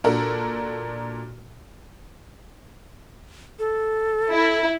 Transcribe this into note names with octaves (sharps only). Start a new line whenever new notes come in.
A#2 D4 F#4 A4 A#4
A4
E4